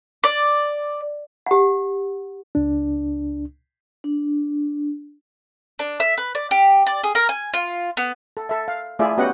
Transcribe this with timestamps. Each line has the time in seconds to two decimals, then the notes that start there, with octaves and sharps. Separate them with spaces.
0.24 D5
1.46 G4 F#5
2.55 C#2 D4
4.04 D4
5.79 D4
6.00 E5
6.18 B4
6.35 D5
6.51 G4
6.87 D5
7.04 G#4
7.15 A#4
7.29 G#5
7.54 F4
7.97 B3
8.37 A4
8.49 A4 E5
8.68 F5
8.99 A3 E4 F4 G#4 D5 E5
9.18 B3 C#4 F#4 G4 D#5 F#5